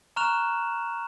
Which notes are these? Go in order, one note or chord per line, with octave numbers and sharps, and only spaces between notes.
A#5 C#6 F6 F#6 E7 F7